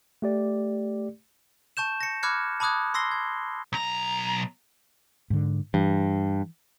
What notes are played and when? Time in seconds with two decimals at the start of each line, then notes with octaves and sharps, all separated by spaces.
0.22 A3 G4 D5
1.77 A5 C#6 G6 E7
2.01 A#6 C#7
2.23 B5 D6 F6 F#6 G#6 C#7
2.60 A5 B5 D6 D#6 F#6 G#6
2.94 C6 E6 A#6 C7 G7
3.11 G#6
3.73 B1 A#5
5.30 G#2 D3
5.74 G2 E3